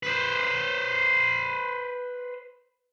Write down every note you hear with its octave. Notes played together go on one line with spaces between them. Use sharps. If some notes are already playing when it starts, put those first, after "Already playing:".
B4 C5